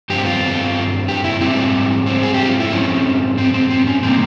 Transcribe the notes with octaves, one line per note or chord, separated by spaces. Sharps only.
G2 F3 C4 G4
F4
G4
E4
G#2 G3 C4 E4
C4
G#4
G4
F4
E4
G#2 F3 C4 C#4
C4
C4
C4
C#4
C3 G3 A#3 C4